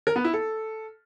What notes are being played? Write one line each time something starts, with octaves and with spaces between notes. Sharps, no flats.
A#4
B3
E4
A4